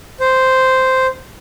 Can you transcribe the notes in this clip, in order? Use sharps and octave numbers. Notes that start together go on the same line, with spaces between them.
C5